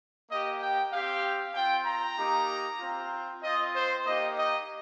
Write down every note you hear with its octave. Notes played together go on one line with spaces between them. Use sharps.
A#3 G4 D#5
G5
C4 G4 F5
C4 F4 G5
A#5
A#3 D#4 G4
C4 F4
C4 F4 D#5
C5
A#3 D#4 G4 D#5
D#5